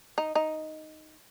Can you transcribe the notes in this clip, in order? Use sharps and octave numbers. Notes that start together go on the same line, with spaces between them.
D#4
D#4